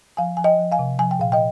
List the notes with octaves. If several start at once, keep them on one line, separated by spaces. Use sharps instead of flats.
F3 F5 G#5
F3 G#5
D#5 G5
F3
F5 G#5
C3
F3 G#5
G5
A#2 F5
D#5 G5